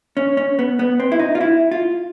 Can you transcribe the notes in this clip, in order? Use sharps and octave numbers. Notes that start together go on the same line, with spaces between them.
C#4
C#4
B3
B3
C4
E4
D#4
F4
E4
F4